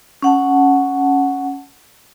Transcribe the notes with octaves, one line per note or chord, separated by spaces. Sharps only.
C#4 F#5 A5